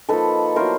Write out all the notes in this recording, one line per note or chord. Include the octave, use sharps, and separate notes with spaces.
F3 A#3 D#4 A4 B4
F#3 B3 E4 A#4 C5